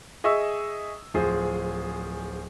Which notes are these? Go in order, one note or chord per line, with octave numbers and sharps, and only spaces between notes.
G#4 D#5 E5 C#6 D#6 E6
D1 F3 G#4 C5